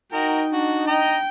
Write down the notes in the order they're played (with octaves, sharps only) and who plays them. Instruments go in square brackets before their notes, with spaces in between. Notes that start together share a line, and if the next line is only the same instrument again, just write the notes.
[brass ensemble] D#4 [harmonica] F#4 A#4 [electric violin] D#5 G5
[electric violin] D4 [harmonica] F#4
[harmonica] D#5 A#5 [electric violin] G5